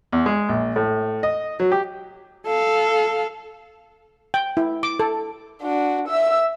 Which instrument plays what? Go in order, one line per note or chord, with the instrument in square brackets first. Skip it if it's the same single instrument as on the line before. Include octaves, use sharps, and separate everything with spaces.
[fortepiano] E2
G#3
A#1
A2
D#5
F#3
G4
[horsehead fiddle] A4 F5
[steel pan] G5
E4
D6
A4
[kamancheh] D4 F#4
E5 E6